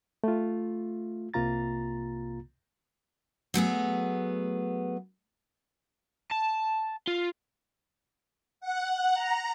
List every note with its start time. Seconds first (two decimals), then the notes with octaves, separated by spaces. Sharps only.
0.24 A3 F4
1.34 C2 C3 A#3 F4 A#5 A6
3.54 F#3 A3 B3 G#4
6.31 A5
7.08 F4
8.60 F#5
9.14 A#5